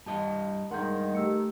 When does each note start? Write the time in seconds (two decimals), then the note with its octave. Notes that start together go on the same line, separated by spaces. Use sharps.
0.06 G2 G4 D#5 A5
0.71 G2 D#3 G#3 G#4 F#5 C6 G6
1.15 A3 G4 E6 C#7